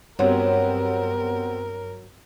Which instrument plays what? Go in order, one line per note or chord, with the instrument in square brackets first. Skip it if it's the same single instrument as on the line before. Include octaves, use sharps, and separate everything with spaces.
[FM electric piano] G2 [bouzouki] F#3 [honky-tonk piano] B3 C4 G4 [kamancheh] A#4